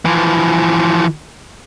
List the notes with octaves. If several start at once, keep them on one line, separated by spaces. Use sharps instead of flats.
E3 F3